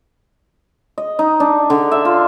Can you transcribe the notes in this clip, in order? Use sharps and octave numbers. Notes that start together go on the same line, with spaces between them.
D#5
D#4
D4
D3
E5
F4